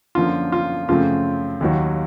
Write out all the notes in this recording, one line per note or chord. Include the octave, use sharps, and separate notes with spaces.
F#2 D3 F3 A#3 F4
F4
F#2 C#3 F3 A3 C4 F4
D#2 D#3 F#3